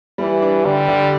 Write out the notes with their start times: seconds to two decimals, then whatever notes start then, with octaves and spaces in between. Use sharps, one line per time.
0.18 E3 G3
0.42 D4
0.65 D3 G3
0.88 D3